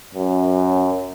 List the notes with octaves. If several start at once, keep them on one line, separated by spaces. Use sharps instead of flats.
F#2